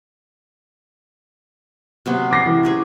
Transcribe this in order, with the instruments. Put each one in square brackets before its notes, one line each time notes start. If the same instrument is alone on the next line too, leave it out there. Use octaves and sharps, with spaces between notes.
[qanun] C3 F#3 B3
[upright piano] D6 A#6 C7
E3
[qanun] C#4 G4 G#4